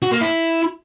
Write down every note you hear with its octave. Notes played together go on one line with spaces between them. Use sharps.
F#4
A#3
E4